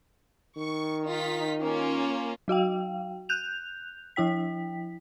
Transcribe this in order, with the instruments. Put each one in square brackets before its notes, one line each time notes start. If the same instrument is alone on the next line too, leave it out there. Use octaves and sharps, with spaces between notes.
[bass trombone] D#3 [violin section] C#6
[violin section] D#4 F4 B6
A#3 C#4 F4
[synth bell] F#3 F#4 F5 G5
F#6 G6 F7
F3 E4 G5 B6